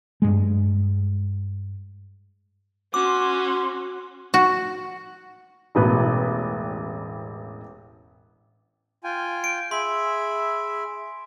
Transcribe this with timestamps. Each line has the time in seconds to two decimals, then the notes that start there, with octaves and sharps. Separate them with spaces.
0.22 G2 G#3
2.94 C#4 F#4 C6 D6
4.34 F#4
5.75 E1 A1 B4
9.04 F4 G5 G#5
9.44 D7
9.71 G#4 E5 B5 C6